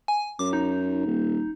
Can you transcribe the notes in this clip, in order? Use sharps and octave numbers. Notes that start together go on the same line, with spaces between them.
G#5
F#2 D6
D#4
D#1